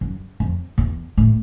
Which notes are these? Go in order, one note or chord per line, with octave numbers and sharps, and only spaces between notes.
F#2
F2
E2
A2